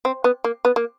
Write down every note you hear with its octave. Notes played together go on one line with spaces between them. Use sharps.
C4
B3
A#3
B3
A#3